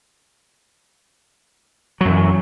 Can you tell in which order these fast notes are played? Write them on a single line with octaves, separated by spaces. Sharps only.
F#3 F#2 E3